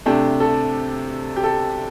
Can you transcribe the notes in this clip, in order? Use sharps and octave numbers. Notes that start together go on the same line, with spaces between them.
C3 A3 D4 G4
A4
G4
A4